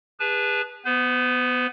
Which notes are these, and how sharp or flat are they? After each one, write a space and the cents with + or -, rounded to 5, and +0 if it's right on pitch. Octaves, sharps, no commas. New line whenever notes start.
G#4 -40 B4 -10 A5 -25
B3 +0 C5 -45